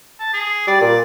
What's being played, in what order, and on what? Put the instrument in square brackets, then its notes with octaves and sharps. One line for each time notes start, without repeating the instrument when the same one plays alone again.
[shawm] A5
G#4
[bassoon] G3 [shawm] D5
[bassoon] A#2 [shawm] D5